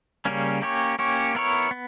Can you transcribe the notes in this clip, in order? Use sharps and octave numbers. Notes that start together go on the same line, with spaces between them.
C#3 G3 A#3 C#4
A#3 C#4 G4 C#5
A#3 C#4 G4 C#5
B3 E4 A#4 C#5
B3